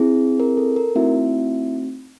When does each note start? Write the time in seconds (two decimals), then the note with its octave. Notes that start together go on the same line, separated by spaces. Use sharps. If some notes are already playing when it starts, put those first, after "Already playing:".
Already playing: C4 E4 G#4
0.40 A#4
0.57 A4
0.76 A#4
0.95 A3 C4 D#4 E4 F#4 E5